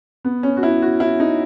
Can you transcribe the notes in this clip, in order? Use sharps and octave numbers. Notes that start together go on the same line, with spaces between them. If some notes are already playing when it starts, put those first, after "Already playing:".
B3
C#4
F#4
E4
F#4
E4
D#4